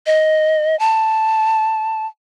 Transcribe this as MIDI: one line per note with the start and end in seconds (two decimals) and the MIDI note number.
0.06 0.78 75
0.79 2.06 81